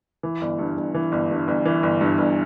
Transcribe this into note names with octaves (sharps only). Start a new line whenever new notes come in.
E3
G1
G2
G1
E3
G1
G2
G1
E3
G1
G2
G1